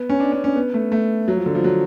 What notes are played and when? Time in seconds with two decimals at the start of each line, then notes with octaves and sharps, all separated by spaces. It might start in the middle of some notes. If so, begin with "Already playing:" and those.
Already playing: B3
0.09 C#4
0.20 D4
0.32 C#4
0.44 C#4
0.56 B3
0.74 A3
0.92 A3
1.28 F#3
1.37 F3
1.46 D3
1.55 F3
1.64 F#3